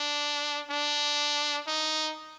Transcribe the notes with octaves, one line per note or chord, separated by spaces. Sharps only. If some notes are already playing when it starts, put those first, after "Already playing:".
Already playing: D4
D4
D#4